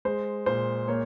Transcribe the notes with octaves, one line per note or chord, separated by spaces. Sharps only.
G#3 C5
A#2 C5
A#3 C#5